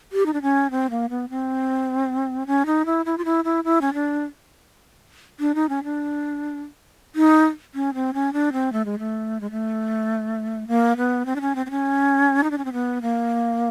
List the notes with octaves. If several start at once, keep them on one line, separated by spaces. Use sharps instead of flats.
G4
D#4
D4
C#4
C4
A#3
B3
C4
C#4
D#4
E4
E4
F4
E4
E4
E4
C#4
D4
D4
D#4
C#4
D4
D#4
C#4
C4
C#4
D4
C4
A3
G#3
A3
G#3
A3
A#3
B3
C4
D4
C#4
C4
C4
C#4
D#4
D4
C#4
C4
B3
A#3